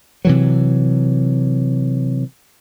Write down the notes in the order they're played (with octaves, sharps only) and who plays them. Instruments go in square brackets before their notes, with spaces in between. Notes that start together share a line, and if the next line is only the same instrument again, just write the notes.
[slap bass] C3 E3 F#3